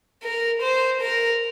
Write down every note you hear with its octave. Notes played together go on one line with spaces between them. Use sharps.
A#4
C5
A#4